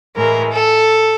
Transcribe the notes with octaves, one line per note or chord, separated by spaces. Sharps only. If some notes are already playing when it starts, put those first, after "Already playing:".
A2 E3 G#3 A#4
A4